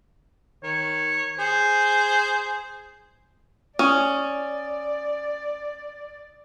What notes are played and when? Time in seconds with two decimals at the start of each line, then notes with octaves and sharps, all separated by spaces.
0.63 D#3 C#5
1.39 G#4 C5
3.79 C#4 D5 D#6